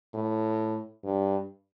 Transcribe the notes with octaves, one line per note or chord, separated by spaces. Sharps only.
A2
G2